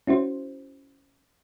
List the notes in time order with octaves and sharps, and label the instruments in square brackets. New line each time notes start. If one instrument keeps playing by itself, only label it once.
[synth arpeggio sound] C#4 E4 F#4 C5